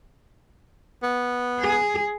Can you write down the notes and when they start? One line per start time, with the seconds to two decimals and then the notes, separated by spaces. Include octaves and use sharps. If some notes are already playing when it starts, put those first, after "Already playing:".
1.03 B3
1.60 G#4